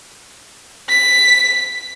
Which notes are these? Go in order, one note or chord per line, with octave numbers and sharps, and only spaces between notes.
B6